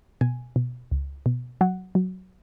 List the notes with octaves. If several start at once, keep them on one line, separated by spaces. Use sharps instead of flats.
B2 G#5
B2
C#2
B2
F#3 F#5
F#3